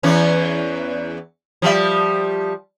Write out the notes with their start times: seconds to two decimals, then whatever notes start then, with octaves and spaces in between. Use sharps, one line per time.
0.03 E2 E3 C#4
1.62 F3 G3 E5